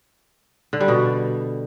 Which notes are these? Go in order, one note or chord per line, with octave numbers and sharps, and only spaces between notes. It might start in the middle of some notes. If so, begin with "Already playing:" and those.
D3
G3
B2